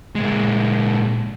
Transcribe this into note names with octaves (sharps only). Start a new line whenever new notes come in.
A#2 G#3